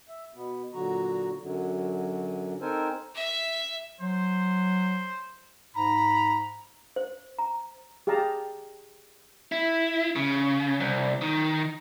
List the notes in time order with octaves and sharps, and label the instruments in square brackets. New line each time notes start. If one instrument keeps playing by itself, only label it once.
[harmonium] E5
B2 B3
A#2 D3 F#3 F#4 A#5
F#2 D3 F#3
C4 D#4 A4 A#4 C5 G#5
[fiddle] E5
[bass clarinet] F#3 [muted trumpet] C5
[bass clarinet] G#2 [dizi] A#5 [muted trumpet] B5
[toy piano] C5
A#5
[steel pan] G4 G#4 F5 A5 A#5
[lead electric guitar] E4
C#3
C2
D#3